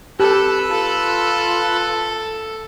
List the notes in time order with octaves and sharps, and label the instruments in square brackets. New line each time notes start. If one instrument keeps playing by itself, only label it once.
[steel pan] G4 [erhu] A4 [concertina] B4 E6 F#6
[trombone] F4 [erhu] A4